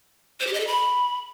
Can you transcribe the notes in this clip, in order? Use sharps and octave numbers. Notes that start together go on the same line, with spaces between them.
C5
G4
D#5
A4
B5